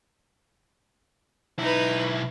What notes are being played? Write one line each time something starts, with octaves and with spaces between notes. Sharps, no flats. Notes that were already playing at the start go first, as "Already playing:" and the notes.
B1 D#4 E4 B4